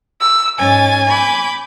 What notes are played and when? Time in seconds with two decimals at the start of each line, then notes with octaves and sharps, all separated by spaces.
0.21 E6
0.59 G#2 C#4 G#5 A6
1.09 B5 D6 G6